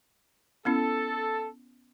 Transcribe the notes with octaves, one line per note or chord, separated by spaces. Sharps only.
B3 C#4 E4 A4